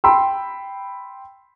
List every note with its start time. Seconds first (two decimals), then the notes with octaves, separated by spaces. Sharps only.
0.04 G5 B5 C6 E6